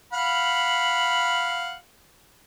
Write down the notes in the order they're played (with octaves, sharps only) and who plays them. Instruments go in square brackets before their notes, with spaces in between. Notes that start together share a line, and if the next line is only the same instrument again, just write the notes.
[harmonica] F5 F#5 B5